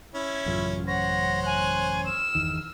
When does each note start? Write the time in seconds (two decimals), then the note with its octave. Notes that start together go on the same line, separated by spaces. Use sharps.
0.14 C#4 E4
0.46 A1 F#2 C#3 F4
0.88 C5 C#5 F#5 A#6
1.46 G#5 F#6
2.06 E6 F6 E7
2.35 G1 E2 D#3